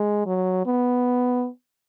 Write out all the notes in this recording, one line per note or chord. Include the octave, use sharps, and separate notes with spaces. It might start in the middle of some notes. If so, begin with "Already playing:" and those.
Already playing: G#3
F#3
B3